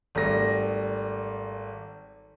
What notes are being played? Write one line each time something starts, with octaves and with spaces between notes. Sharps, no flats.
G#1 G3 A3 A#6